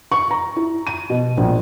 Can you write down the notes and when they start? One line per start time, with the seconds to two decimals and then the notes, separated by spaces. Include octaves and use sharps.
0.12 C#6
0.31 A#5
0.56 E4
0.87 D#7
1.10 B2
1.37 A#1